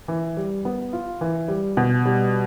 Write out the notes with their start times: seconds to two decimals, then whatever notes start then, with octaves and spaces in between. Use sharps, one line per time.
0.08 E3
0.37 G3
0.65 B3
0.93 F4
1.21 E3
1.48 G3
1.77 B2
2.05 G3